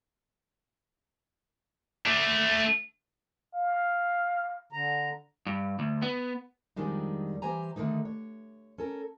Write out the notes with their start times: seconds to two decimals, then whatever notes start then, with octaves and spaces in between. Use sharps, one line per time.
2.06 A3 D4
3.54 F5
4.73 D3 A#5
5.46 G2
5.79 D2
6.02 B3
6.76 F2 D#3 G3 G#3 D4 D#4
7.42 E3 G4 C5 G#5 A#5
7.76 D3 D#3 A3 A#3 D#4
8.05 C#5
8.78 C#4 A4 A#4